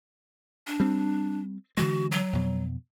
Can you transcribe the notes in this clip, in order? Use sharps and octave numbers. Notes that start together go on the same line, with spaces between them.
D4
G3 C4
D3 E3 G#3 F#4
F#3
F2 B2